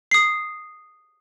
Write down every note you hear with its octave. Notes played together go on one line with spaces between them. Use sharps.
D#6 C7